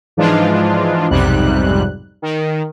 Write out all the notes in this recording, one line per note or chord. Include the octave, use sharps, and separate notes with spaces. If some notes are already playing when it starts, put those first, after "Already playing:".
G#2 E3 F3 G#3 D4 F4
B1 F2 G#2 C3 G3 F#6
D#3